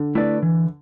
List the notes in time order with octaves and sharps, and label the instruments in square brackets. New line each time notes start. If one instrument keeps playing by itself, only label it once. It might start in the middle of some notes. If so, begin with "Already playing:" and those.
Already playing: [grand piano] D3
[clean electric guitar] A3 E4 B4 D5
E3